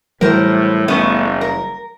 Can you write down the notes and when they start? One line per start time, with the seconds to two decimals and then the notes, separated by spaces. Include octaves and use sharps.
0.21 A2 E3 F#3 G3 A#4 C5
0.88 F#1 A3 B3 C#4
1.41 A#4